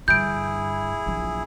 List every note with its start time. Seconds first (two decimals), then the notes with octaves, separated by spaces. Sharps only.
0.08 G2 D3 E4 G#4 G6 D7
1.06 A#1 F#3